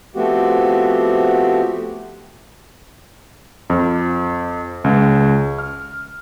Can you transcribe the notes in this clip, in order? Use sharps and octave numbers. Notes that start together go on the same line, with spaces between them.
F3 A3 B3 C4 F#4 G4
F2
C#2
F6